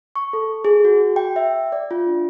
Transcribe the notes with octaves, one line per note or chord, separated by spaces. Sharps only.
C#6
A4
G#4
F#4
G5
E5
D5
F4
D4